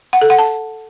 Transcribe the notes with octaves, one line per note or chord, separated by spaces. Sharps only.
F#5
A4
F#5
A5